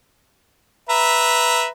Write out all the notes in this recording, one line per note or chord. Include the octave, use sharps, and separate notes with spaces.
B4 E5 A#5